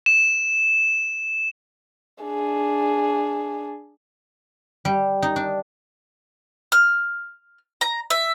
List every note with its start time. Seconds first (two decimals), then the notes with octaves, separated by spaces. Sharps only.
0.06 E7
2.23 D4 G#4
4.85 G3
5.22 D#4
5.36 D4
6.72 F6
7.81 A#5
8.10 E5